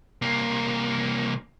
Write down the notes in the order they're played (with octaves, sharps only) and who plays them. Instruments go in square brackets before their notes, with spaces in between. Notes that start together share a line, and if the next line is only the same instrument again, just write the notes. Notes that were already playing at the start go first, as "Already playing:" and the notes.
[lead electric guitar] C2 A#3